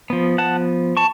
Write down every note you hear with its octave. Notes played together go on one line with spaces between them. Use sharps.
F3 B3
F#5 A5
A5 C#6